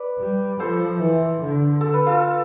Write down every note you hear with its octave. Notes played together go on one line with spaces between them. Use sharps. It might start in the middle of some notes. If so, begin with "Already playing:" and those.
Already playing: B4 D5
G3
F3 A4 C5
E3
D3
A4
B4
F4 A4